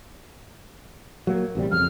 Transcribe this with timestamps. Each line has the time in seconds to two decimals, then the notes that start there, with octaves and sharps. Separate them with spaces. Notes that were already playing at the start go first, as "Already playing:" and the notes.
1.27 F#3 A#3
1.55 A1 C3 G3
1.72 F2 C#3 F6